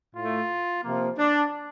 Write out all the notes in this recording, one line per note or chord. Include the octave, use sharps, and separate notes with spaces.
A2 A3 F4
C3 F3 A#3
D4